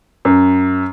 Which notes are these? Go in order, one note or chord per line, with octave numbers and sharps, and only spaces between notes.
F#2